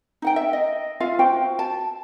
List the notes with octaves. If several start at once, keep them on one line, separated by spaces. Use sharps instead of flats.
D#4 F#5 G5
E5
D#5
F4 E5 F5
F4 F#4 C5 G5
A5